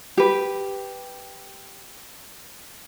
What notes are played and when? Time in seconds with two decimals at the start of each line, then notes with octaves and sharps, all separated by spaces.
0.17 G4 B4